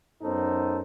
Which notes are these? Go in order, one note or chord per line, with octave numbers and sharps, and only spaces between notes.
F#2 B3 D#4 A4 C5